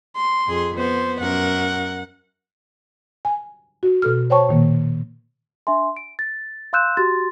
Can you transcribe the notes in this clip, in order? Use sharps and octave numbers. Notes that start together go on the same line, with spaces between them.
C6
F2 G#4
B3 C5
F#2 A#4 F#5
G#5
F#4
B2 A4 F6
C5 C#5 G5 A5 C#6
A#2 D#3 A#3
D4 E5 G#5 C6
D7
A6
F5 C6 E6 F#6 G6 E7
F#4 G4 C6 A6